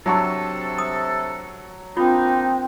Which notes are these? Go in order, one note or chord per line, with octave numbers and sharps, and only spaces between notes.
C3 F#3 D4 A4 A5 C#6
D#6
A#3 C4 D4 D#4 F4